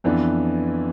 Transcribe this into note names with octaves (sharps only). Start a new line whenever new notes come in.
F2 E3 B3 D4